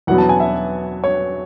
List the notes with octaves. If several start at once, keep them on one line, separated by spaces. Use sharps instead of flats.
E2 B2 F#3 B3 F#5
A5
G#5
E5
C#5